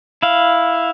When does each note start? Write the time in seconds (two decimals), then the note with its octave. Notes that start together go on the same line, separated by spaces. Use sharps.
0.22 E4 F5